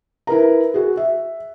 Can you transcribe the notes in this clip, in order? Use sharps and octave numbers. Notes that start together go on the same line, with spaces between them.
E4 A#4 B4 A#5
F#4 G#4
E5